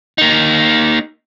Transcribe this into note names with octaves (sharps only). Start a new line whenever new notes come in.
A#3 D#4